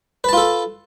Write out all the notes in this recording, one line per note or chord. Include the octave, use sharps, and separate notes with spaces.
F4 A4 B4 A5